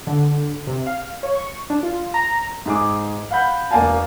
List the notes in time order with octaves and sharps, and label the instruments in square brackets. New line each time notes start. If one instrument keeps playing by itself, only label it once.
[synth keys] D3
C3
F5
C#5
C#6
D4
F4
A#5
[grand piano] G#2 G#4 D6
F5 F#5 B5 G6
E1 A#3 D5 F5 G#5 A5